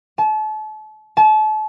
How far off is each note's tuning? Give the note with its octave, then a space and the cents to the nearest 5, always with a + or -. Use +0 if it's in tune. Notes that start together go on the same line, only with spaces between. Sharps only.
A5 -35
A5 -35